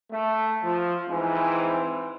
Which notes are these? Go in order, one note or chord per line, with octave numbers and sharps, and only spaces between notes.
A3
F3
G#2 E3 C4